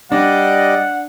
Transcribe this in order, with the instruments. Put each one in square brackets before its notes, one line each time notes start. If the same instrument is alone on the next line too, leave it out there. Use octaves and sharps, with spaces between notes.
[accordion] G3 D5 D#5 [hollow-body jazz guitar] D4 [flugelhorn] F#5